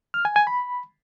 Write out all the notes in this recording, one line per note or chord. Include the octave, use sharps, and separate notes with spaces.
F6
G#5
G#5
B5